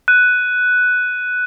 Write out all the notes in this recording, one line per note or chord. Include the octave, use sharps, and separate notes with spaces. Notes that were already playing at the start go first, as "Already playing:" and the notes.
F#6 D#7